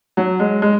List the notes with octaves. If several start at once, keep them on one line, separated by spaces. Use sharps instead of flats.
F#3
G#3
G#3